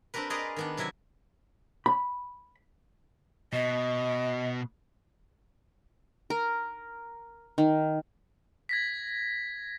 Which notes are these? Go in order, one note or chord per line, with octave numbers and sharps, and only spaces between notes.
C4 D4 G4 A#4 B4
G#4 A#4 B4 D5 D#5 A#5
D#3 B3 D4
C3 F#3 E4 E5 G#5
B5
B2 D#5
A#4
D#3
G#6 A#6 B6